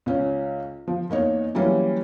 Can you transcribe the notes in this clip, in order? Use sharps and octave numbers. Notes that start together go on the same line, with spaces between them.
C#2 C#4
F3
E2 A#3 D#4 C#5
E3 F#3 G3 A#3 C#4